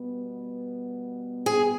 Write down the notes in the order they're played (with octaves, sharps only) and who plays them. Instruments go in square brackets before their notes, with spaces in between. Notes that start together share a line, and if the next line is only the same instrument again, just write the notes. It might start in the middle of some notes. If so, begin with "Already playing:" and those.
Already playing: [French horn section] B2 G3 B3
[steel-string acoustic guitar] G#4